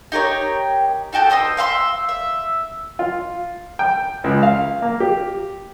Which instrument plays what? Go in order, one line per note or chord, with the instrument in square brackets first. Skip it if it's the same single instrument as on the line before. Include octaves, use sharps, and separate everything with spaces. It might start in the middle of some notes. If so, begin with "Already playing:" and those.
[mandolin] D#4 G4 A#4 C#5
D#4 F#4 G4 A4
B3 C5 D#5 E6
E5 F5 G5 C6
E5
[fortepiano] F4
G5
C#2
F5
A#3
G4